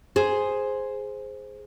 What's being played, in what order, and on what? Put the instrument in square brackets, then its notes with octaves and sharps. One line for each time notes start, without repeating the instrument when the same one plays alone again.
[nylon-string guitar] G#4 C5